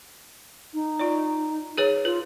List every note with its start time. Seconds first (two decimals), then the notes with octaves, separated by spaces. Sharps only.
0.74 D#4
0.99 F4 D5
1.78 G#4 B4 C#5
2.05 F4 B4